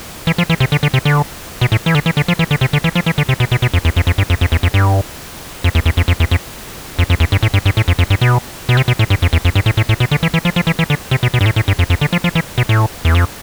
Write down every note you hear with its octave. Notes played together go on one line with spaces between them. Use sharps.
E3
F3
E3
C3
D3
D3
C3
D3
B2
A2
E3
D3
E3
D3
F3
E3
D3
C3
D3
E3
F3
E3
D3
C3
B2
B2
B2
F2
E2
F2
F2
G2
F2
F2
E2
F2
G2
F2
E2
E2
F2
F2
E2
F2
F2
F2
E2
G2
A2
G2
G2
A2
F2
F2
G2
B2
B2
C3
B2
A2
G2
F2
E2
F2
G2
A2
A2
A2
B2
D3
E3
E3
F3
F3
E3
E3
D3
C3
B2
B2
G2
A2
A2
G2
F2
F2
D3
F3
F3
E3
B2
A2
E2
F2